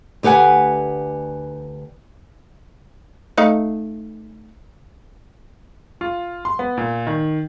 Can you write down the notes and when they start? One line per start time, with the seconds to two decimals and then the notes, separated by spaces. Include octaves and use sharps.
0.23 D2 G4 B4 F#5 G#5
3.38 A3 D#4 F5
6.01 F4
6.45 C6
6.59 B3
6.78 A#2
7.07 D#3